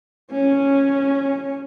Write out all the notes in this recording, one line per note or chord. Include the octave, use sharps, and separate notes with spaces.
C#4